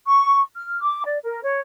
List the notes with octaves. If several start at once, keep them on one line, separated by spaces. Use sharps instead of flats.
C#6
F6
D6
D5
A#4
C#5